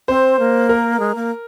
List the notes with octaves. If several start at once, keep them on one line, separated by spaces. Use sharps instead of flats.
C4 C5
A#3
A#4
G#3
A#3